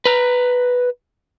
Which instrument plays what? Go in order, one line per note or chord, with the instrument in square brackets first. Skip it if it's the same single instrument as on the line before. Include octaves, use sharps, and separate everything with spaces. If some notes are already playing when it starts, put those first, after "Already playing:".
[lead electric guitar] B4 A#5